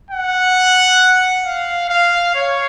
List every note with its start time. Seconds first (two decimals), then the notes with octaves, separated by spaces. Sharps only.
0.11 F#5
1.45 F5
1.90 F5
2.35 C#5